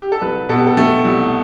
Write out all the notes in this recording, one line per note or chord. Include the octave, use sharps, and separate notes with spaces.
G4
A4
C2 B4
B2 A4
G4
A4
A3 A4
C2